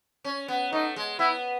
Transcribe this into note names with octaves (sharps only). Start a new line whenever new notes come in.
C#4
B3
A3 D#4
G#3
B3 E4